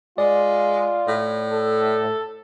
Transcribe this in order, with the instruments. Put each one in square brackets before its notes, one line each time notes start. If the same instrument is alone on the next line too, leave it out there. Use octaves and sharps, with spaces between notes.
[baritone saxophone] G#3 [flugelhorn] F4 [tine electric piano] D5
[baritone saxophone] A2
[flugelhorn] A4